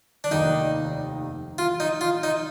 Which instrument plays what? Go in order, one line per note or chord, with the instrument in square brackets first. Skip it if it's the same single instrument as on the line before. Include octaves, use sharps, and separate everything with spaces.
[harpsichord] D4
[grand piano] F1 D#2 D#3 [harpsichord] D#4
[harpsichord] F4
D#4
F4
D#4